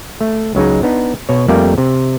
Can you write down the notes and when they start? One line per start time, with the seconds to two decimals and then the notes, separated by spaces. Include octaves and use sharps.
0.21 A3
0.55 C#2 F#3 G#3 D#4
0.83 B3 D4 D#4
1.29 B2 C#5
1.48 F2 G3 A3 A#3 A#4 D5
1.78 C3